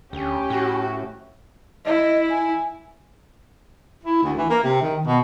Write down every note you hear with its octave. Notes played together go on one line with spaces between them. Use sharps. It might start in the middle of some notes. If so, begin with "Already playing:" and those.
D2 C#4 G4
A2 F#4
E4 D#5
G#5
E4
D2
E3
A#3
C3
D#3
B2